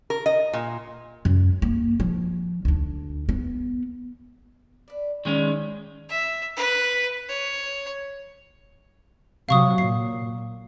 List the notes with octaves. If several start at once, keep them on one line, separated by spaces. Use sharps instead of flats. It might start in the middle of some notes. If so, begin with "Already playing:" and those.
A#4
D#5
A#2
F#2
A#3
F3
D2 D4
B3
D4 B4
D#3 G#3 C#4 E4 D5
E5
B4
C#5
C3 F#3 F5 C#6 D#6
A#2 C7